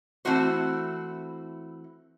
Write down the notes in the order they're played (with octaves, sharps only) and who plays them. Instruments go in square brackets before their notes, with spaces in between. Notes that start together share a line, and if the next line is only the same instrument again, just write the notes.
[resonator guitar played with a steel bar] E3 A3 C4 E4 F#4 C5